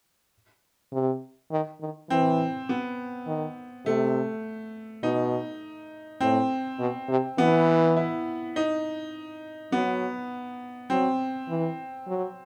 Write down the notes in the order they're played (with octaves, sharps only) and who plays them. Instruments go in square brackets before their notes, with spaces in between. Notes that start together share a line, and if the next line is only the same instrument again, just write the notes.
[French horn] C3
D#3
D#3
[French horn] E3 [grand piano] C4
[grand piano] B3
[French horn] D#3
[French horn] C3 [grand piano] A3
[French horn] B2 [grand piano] D#4
[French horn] A2 [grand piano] C4
[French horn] B2
C3
[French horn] E3 [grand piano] B3
[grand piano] E4
D#4
[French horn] F#3 [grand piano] B3
[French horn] F#3 [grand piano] C4
[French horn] E3
F#3